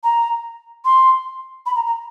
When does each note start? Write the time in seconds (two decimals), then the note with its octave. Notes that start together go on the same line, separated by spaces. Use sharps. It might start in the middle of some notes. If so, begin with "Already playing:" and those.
0.03 A#5
0.85 C6
1.66 B5
1.76 A#5
1.86 A#5